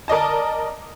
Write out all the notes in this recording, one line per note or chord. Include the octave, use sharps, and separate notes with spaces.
A#4 D5 D#5 A5